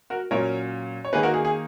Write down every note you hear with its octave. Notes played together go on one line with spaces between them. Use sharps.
F#4 A#4
A#2 F#3 C#4 A#4 C#5
C#5
D#3 A#3 D#4 G#4 B4
F#4 A#4
G#4
G#4